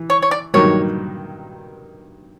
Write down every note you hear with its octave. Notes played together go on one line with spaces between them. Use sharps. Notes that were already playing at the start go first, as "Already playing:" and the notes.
Already playing: E3
C#5
C#5
D5
G2 D#3 F#3 A#3 C#5